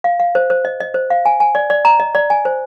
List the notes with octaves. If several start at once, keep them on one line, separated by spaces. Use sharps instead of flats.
F5
F5
C5
C5
D#5
D#5
C5
F5
G#5
G#5
D5
D5
A#5
D#5
D5
G#5
C5